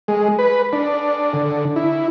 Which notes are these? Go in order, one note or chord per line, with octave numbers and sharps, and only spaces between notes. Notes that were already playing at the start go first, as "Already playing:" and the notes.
G#3
B4
D4
D3
E4